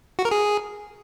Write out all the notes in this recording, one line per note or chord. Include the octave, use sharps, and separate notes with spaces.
F#4
A#4
G#4